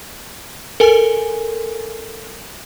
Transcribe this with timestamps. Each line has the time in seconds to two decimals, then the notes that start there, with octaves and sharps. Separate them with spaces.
0.80 A4 A#4 G#5